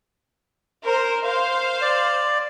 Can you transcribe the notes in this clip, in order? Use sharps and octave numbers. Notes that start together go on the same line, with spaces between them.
A#4 C5
C5 F5
D5